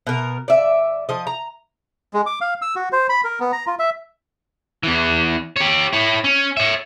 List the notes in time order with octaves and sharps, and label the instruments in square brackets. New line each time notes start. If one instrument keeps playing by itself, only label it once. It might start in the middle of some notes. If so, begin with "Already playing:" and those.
[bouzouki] B2 A#4
D5 E5
F3 D#5
A#5
[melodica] G#3
D6
F5
E6
F#4
C5
B5
A#4
B3
A#5
F4
E5
[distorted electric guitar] E2 E3
G4 C#5
E4 C#5
C#4
C#5 E5